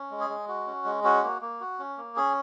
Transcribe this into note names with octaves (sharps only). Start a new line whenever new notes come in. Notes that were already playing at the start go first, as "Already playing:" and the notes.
Already playing: C#4
G#3
G#4
G#3
F#4
C#4
G#3
C#4 F#4
A#3
A#3
F#4
C#4
A#3
C#4 G#4